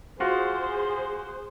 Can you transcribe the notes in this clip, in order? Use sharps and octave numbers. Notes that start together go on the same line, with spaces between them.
F4 F#4 G#4 C5